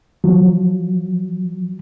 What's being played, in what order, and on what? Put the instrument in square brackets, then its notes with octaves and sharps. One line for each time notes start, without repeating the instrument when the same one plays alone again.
[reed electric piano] F3 F#3